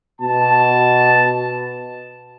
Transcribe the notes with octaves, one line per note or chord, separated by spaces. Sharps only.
B2 A5